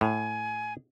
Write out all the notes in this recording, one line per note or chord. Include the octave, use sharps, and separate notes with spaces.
A2 G#5